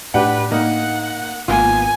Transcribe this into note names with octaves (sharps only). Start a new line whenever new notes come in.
A2 D4 G4 B4 F#5
A#3 D#4 F#5
G#1 A#3 B3 F4 G#5